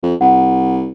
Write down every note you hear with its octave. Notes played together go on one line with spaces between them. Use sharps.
F2
C2 F#5